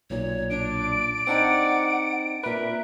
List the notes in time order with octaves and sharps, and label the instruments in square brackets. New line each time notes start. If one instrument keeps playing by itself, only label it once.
[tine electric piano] B1 A#2 [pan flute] C#5
[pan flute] D4 [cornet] D5 [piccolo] D7
[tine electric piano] C4 D4 D#4 [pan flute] F#5
[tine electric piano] A#2 B4 [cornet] A#4 [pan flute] E5